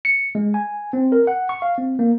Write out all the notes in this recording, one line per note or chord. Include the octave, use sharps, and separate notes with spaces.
C#7
G#3
G#5
C4
A#4
F#5
C#6
F5
C4
A#3